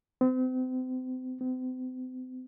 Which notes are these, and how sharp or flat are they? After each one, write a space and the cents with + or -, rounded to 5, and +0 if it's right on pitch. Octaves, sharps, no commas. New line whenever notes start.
C4 -35
C4 -40